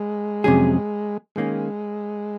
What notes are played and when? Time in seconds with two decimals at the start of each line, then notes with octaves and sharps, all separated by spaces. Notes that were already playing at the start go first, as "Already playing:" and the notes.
Already playing: G#3
0.44 F2 C3 F#3 C#4 G#4
1.36 D#3 G#3 A#3 C#4